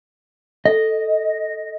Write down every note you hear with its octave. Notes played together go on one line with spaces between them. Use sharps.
A4 D#5